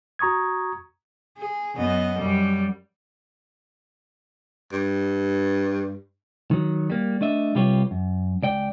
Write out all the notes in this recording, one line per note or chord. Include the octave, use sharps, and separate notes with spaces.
F#4 A#5 C#6 D#6 G#6
G#4
F#2 B3 D#5
F#2 G3
G2
D#3 F#3
G3 A#3
A3 D4 D#5 E5
C3 G3 F4 G4 B4 C#5
F#2
C#2 D5 G5